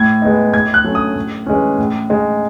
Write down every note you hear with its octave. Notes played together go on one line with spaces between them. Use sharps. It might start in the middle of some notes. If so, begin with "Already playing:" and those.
Already playing: A2 G#6
G#3 B3 D#4
A2 G#6
F#6
F#3 A3 C#4
D#6
A2
E3 G#3 C#4
A2
G#3 D#4